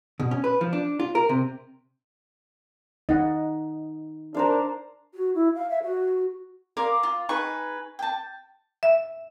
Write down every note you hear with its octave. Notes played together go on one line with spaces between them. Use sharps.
B2
C#4
B4
F3
D4
F4
A#4
C3
D#4 D#5 F#5
D4 A#4 C5 F5
F#4
E4
F5
E5
F#4
A#4 D5 F5 C6
F4
D#4 G#4 B4 C#6
G5 A5
E5